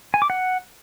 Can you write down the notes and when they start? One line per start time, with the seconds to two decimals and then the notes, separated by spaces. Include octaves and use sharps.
0.14 G#5
0.22 D6
0.30 F#5